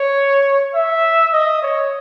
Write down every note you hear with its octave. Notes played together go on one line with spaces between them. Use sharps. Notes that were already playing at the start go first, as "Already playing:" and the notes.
Already playing: C#5
E5
D#5
C#5